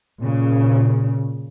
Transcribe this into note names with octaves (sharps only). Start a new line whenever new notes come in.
A#2 C#3